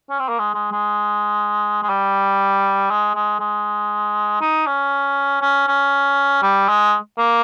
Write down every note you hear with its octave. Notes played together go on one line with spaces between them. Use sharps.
C#4
C4
A#3
G#3
G#3
G#3
G#3
G3
G#3
G#3
G#3
D#4
C#4
C#4
C#4
G3
G#3
A#3